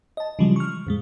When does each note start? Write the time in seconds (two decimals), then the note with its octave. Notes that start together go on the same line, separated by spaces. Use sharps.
0.17 D#5 A5
0.39 C#3 E3 F3 G3 G#3
0.56 C#6 F6
0.87 F2 A#2 G#3